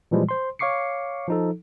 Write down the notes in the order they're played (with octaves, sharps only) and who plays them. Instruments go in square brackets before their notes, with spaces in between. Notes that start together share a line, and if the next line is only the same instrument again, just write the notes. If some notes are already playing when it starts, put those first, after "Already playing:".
[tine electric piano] A#2 E3 F3 G3 G#3
C5 C6
C#5 F5 C#6 D6 C7 C#7
F3 D#4 A4